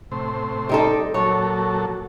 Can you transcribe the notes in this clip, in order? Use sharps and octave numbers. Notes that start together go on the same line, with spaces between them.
A2 C3 C5
G3 D#4 A4
A#2 F#3 A4 C#5